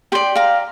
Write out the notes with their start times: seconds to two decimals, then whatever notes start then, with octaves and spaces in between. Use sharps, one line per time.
0.12 G4 D5 G5 C6
0.36 F5 A#5